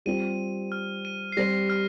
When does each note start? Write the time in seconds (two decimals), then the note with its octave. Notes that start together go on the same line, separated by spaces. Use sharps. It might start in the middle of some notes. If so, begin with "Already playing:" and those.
0.06 G3 C4 F4 D#7
0.72 F6
1.05 D#7
1.32 C7
1.37 G3 C4 G4 C5 A#6
1.70 F6